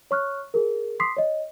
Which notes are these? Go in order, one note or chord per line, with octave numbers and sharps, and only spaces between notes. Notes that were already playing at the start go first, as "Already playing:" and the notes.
C#5 C#6 F6 F#6
G#4 A#4
C6 D6 D#6 B6 C7
C#5 D#5